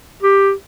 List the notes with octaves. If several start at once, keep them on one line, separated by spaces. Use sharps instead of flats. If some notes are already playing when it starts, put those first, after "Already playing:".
G4